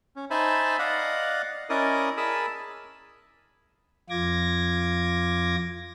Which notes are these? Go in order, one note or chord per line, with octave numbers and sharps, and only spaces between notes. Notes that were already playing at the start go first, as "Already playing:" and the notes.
C#4
D#4 C5 E5 G#5 A5 B5
D5 D#5 F5 F#5 F#6
C#4 E4 A#4 D5 D#5 D#6
G#4 A#4 A5 B5 D#6 E6
F2 F4 D6 G#6 A#6